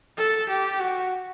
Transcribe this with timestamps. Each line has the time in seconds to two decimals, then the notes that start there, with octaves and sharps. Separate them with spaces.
0.18 A4
0.49 G4
0.80 F#4